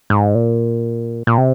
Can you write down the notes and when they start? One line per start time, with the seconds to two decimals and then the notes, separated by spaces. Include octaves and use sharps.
0.10 G#2
0.35 A#2
1.27 A#2
1.38 C3